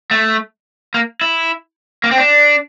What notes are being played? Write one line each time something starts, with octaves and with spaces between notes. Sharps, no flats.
A3
A#3
E4
A#3
C4
D4